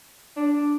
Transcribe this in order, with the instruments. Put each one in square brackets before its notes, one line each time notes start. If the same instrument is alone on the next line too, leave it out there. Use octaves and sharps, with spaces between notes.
[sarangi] D4